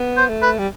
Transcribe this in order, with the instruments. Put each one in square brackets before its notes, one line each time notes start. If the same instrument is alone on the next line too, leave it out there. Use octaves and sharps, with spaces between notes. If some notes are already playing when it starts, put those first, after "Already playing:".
Already playing: [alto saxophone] B3
[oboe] C5
[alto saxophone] A3
[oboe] B4
[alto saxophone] G3